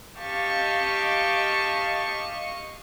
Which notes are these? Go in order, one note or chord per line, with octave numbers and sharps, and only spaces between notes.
G4 D#5 F5 A5 C#6